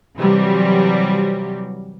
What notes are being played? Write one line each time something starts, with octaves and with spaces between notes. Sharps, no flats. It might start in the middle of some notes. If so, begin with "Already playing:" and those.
C3 E3 F#3 G3